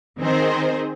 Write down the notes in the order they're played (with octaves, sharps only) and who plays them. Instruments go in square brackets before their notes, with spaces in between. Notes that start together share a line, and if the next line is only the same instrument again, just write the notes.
[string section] D#3 C4 G#4 C5